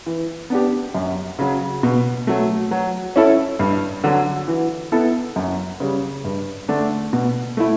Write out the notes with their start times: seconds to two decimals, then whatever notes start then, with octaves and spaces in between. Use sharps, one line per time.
0.06 E3
0.50 B3 D4 G4
0.95 F#2
1.39 C#3 F#3
1.83 B2
2.27 F#3 A3
2.71 F#3
3.16 C#4 E4 A4
3.59 G2
4.04 D3 F#3
4.48 E3
4.92 B3 E4 A4
5.36 F#2
5.80 C#3 G3
6.24 G2
6.68 D3 A3 D4
7.13 B2
7.57 A3 E4